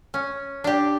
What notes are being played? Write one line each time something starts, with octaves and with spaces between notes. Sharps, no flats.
C#4
D4 G4